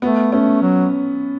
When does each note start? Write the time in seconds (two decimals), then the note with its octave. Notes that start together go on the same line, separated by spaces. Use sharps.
0.02 A3 B3
0.32 A3 C#4
0.62 F#3